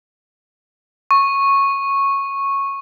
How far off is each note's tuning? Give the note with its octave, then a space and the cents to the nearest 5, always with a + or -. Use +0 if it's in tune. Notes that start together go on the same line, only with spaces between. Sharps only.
C#6 -10